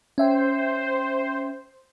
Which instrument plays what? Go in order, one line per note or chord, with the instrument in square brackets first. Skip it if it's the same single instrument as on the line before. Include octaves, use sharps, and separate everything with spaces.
[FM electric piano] C#4 E5 G5 [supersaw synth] C5